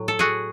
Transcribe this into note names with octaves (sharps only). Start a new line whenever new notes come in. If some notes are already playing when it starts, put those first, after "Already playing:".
Already playing: A2 F#3
A4
F#4 G#4